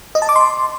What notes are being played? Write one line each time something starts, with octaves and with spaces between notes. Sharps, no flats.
D#5
A5
D6
C6